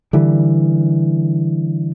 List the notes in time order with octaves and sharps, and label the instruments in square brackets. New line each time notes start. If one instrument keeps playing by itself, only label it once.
[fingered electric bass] D3 E3 G3